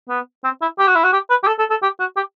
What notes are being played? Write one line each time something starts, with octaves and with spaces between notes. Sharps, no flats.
B3
C4
E4
G4
F#4
E4
F#4
G4
B4
G4
A4
A4
A4
G4
F#4
G4